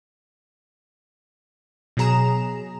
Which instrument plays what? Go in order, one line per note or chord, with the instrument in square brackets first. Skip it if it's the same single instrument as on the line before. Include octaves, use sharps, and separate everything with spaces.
[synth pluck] B2 F#3 G#4 A#5 E7